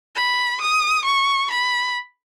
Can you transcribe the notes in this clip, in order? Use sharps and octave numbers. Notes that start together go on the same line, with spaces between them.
B5
D#6
C#6
B5